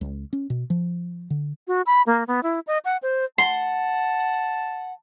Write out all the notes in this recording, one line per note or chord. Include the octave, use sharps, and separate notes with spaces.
C#2
C#4
B2
F3
D3
F#4
B5
A#3
B3
E4
D#5
F#5
C5
F#5 A5 C6